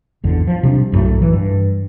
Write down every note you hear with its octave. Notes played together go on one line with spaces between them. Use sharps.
G#1 E2 D3
F3
C3 G3 D4
B1 F#2 A2 A3
E3
G2